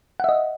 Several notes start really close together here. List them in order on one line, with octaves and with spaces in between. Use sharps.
F#5 E5 D#5